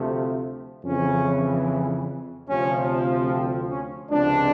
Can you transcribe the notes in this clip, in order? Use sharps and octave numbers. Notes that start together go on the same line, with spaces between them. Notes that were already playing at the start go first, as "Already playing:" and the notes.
Already playing: D2 C3 F3 A3
F2 C#3 E3 C#4
D2 C3 F3 C#4
C4
C#4
C#2 C3 F3 G#3 C4 D4